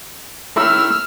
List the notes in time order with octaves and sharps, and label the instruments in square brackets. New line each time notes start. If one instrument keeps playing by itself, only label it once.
[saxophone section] D#3 C#4 E4 [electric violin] E6 F6